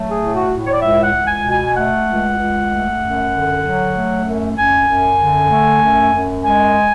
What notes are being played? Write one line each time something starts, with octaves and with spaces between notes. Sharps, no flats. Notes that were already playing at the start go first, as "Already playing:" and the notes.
Already playing: F#3 A3
G#4
A2
F#4
A2
C#5
D5
C#2 E5
F#5
C#2
G#5
B2
G#5
A3 F#5
C#2
C#2
A3
F#2
D3
F#3
A3
F#2
F#2 G#5
F#2
D3
A3
F#2
F#2
G#3 G#5